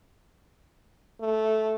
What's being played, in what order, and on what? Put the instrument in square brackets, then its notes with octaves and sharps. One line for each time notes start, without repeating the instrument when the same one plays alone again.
[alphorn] A3